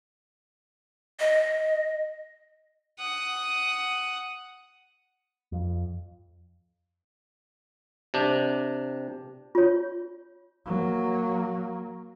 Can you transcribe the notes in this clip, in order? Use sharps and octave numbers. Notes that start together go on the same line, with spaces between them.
D#5
F#5 D#6
F2
C3 D4
F4 C#5
F#3 A#3